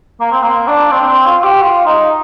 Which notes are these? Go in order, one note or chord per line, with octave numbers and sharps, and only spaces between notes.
A#3
C4
A#3
D4
C4
C4
F4
G4
F4
D#4